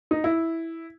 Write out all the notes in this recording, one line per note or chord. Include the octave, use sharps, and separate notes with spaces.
D#4
E4